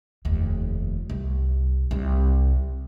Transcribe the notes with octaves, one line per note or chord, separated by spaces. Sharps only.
F1 D#2
C2
C2